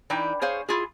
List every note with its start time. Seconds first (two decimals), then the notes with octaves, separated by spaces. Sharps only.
0.10 E3 D4 D#4 G5
0.42 G#4 C5 C#5 F5
0.69 E4 F4 G#4